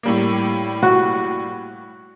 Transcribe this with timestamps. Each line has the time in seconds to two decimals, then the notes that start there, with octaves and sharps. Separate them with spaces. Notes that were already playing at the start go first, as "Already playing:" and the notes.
0.03 A2 G3 A#3
0.83 F#4